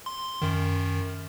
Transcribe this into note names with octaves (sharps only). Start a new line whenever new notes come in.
C6
F#2 D#3